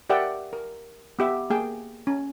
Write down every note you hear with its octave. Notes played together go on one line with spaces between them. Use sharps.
G4 A#4 D5 E5 F#5 G5
A#4
B3 G4 E5
A#3 G#4 G5
C#4